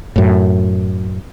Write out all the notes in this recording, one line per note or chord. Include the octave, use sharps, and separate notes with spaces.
F#2 A2